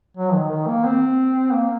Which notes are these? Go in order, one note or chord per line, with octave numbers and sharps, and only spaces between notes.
F#3
D#3
D#3
A#3
C4
A#3